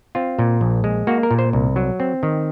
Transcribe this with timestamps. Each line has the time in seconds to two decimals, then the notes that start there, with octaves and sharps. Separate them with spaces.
0.15 C4 F4
0.39 A#2
0.61 A#1
0.84 G#3
1.07 A#3 F#4
1.23 A#4
1.31 A#2
1.39 C5
1.53 C2
1.76 F#3
2.00 C4
2.23 D#3